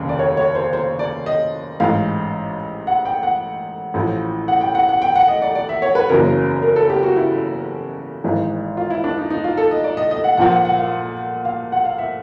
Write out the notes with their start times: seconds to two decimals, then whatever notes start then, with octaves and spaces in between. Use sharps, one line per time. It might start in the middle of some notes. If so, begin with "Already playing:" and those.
Already playing: F1 D#2 C#3
0.09 D5
0.19 C#5
0.37 C#5
0.55 C5
0.73 C5
0.99 D5
1.26 D#5
1.80 A1 G#2 E3 F5
2.87 F#5
3.05 G5
3.23 F#5
3.94 A1 A2 F3
4.48 F#5
4.61 G5
4.75 F#5
4.89 F#5
5.02 G5
5.16 F#5
5.28 D#5
5.42 D5
5.55 D5
5.69 E5
5.82 C#5
5.95 B4
6.09 F#1 E2 C#3 F#3 A#4
6.63 A#4
6.76 A4
6.90 G4
7.03 F#4
7.16 E4
8.24 G#1 G#2 E3
8.77 F4
8.90 E4
9.04 D4
9.18 D#4
9.30 D#4
9.44 F4
9.57 A4
9.71 D#5
9.84 D5
9.97 D#5
10.11 D#5
10.24 F#5
10.37 A#1 A#2 F3 F#5
10.52 F#5
10.65 F#5
10.78 F5
11.45 F5
11.72 F#5
11.85 F5
11.98 E5